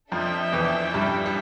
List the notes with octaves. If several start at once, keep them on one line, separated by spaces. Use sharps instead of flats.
F2 F3 D4 A4 E5 G5
E2 E3
G2 G3
G3